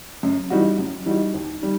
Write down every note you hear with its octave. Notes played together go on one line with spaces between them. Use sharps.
F#2
E3 G3 D#4 F#4
F#2
E3 G3 D#4 F#4
D#2
D#3 G3